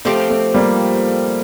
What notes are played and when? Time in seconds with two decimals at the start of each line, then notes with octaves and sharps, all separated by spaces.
0.05 F3 A3 C4 G4
0.30 A3
0.54 G3 A#3